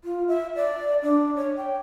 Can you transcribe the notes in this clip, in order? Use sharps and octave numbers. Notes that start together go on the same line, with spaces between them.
F4
E5
D5
D4
C#5
G5